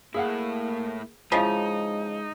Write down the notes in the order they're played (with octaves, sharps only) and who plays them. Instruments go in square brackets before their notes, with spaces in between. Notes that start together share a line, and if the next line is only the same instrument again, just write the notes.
[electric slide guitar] A2 E4 [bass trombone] A#3 [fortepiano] G#4 F5 F#5
[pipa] C#3 F3 [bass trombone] G#3 [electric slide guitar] D#4 [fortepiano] E4 D#5